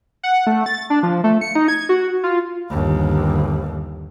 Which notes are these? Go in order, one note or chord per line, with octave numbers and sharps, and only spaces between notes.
F#5
A3
A6
D4
F3
A3
C#7
D#4
G#6
F#4
F4
G1 D#2